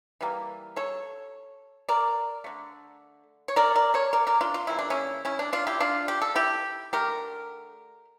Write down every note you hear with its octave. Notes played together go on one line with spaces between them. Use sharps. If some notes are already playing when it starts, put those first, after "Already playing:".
E3 G3 A#3
A4 C#5
A#4 D5
D3 A3
C#5
A#4 D5
A#4 D5
A4 C#5
A#4 D5
A#4 D5
D4 F4
F4
C#3 E3 G3 A#3 E4
D4
C#4 E4
C#4 E4
D4
D4 F4
E4 G4
D4 F4
G4
A4
E4 G4
D3 A3 G4 A#4